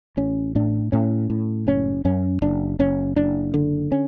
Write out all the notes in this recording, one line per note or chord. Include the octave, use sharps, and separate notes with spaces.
A1 C#4
A2 D4
A2 C#4
A2
F#1 C#4
F#2 C#4
F#1 D4
F#1 C#4
F#1 D4
D3
C#4